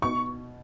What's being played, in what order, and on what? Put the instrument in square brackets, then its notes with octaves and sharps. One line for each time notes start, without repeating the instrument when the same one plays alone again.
[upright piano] B2 [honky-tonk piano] C#6